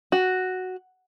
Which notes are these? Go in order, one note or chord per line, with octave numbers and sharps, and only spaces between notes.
F#4